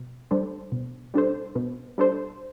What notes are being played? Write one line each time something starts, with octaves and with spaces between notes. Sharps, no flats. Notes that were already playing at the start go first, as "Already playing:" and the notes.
Already playing: B2
G3 D4 A4 C5
B2
G3 D4 A4 C5
B2
G3 D4 A4 C5